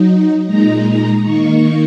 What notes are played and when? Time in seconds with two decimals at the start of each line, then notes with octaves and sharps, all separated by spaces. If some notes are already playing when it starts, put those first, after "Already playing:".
Already playing: F#3 D#4
0.46 A#2 G#3 D#4 A#5
0.84 A#5
1.23 D#3 A#3 D#4 C#6